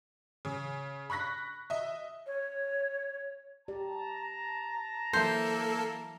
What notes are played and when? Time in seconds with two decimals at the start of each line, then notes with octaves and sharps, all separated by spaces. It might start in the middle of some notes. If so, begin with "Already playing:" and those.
0.45 C#3
1.10 B5 C#6 F#6 A#6 B6
1.70 D#5 E5
2.27 C#5
3.68 G4 D5 A5 A#5
5.13 E3 F#3 A#3 A4 C5 E5